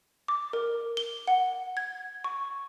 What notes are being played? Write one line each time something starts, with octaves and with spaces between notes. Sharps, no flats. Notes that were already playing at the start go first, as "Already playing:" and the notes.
D6
A#4
G7
F#5
G#6
C#6